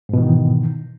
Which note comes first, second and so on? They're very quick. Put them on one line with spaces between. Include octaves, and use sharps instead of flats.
G#2 B2 E3 D#3